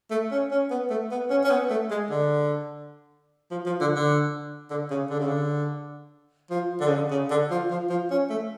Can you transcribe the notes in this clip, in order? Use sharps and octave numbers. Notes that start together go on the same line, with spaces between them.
A3
C#4
C#4
B3
A3
B3
C#4
C#4
B3
A3
G#3
D3
F3
F3
D3
D3
D3
C#3
D3
C#3
D3
F3
D3
C#3
D3
C#3
D3
F3
F3
F3
C#4
A3